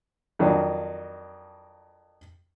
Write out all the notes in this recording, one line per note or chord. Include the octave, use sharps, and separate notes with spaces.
F2 D#3 F#3 D4 F4